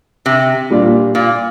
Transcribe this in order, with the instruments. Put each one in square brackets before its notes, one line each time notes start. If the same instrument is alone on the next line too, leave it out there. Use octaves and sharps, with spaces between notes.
[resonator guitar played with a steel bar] C3
[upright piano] A#2 G3 D4 F4
[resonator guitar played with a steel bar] A#2